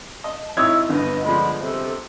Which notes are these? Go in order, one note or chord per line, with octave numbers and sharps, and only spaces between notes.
D#5 A5
G#1 E4 C#5 D#6 E6 G#6
G1 B3 D#5
D3 F3 G#3 B5
C3 A4